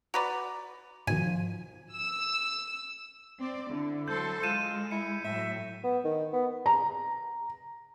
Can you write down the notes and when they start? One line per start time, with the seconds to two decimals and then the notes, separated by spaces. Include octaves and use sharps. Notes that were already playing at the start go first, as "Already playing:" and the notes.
0.14 F#4 B4 D5 A#5
1.07 G#2 B2 D#3 F3 G#5 D#7
1.93 E6
3.39 C4 D5
3.70 D3 E4
4.08 F#3 A4 C5 G6
4.43 G#3 F4 G6 D#7 E7
4.91 E4 C#7
5.24 A2 F#3 E5
5.84 B3
6.05 D#3
6.33 B3
6.66 A#5